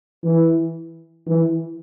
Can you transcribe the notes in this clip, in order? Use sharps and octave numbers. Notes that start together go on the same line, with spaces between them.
E3
E3